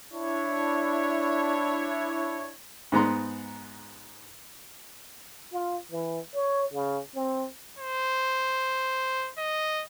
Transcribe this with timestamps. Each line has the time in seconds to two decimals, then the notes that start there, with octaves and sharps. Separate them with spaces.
0.13 D4 E4 C#5
2.92 G#2 B3 A#5 C6
5.52 F4
5.92 E3
6.34 C#5
6.73 C#3
7.15 C4
7.79 C5
9.38 D#5